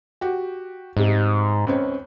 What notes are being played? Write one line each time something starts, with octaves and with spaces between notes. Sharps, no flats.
F#4 G4
G#2 C3 G3 G#3
C#2 C4 C#4